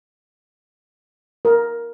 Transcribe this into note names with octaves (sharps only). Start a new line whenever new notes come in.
A#4